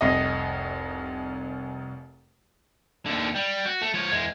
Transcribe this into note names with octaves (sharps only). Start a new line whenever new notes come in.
F1 C2 D#5
D#2 D3
G3
F#4
A3
F3 C#5
E2 G#3